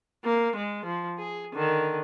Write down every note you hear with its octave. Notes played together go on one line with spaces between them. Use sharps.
A#3
G#3
F3
G#4
D3 D#3